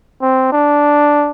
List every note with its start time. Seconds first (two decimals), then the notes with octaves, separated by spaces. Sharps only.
0.21 C4
0.52 D4